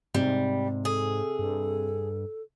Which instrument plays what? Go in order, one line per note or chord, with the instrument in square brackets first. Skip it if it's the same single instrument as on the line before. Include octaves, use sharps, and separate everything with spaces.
[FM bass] G#2 [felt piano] C3 [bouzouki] G3
[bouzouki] G#4 [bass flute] A4
[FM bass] G2